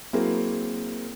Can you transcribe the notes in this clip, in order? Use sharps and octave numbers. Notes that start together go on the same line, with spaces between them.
F#3 A#3 C4 E4 G#4 A#4